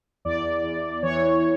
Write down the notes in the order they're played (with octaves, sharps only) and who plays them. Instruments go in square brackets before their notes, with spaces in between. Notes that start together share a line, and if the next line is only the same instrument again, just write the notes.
[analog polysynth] E2 D5
E2
E3 C#5